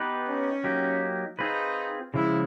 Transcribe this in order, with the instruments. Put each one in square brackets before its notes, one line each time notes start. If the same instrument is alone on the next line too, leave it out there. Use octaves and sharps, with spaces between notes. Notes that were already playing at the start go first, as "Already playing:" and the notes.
Already playing: [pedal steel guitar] B3 D#4 G4 B4
[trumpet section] C#4
[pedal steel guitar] F#3 A#3 D#4 G4
[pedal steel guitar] C4 F4 G#4 B4 [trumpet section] D#4
[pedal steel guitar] C#3 F3 G#3 [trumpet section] E4